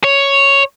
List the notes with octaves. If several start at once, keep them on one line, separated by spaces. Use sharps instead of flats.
C#5